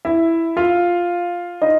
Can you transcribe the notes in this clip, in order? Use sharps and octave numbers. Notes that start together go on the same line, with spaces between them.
E4 E5
F4 F5
D#4 D#5